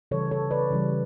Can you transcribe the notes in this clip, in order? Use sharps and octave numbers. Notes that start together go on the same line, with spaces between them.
C#3 E3 G3 A4 C#5
A4 C#5
B4 D5
C#3 E3 G3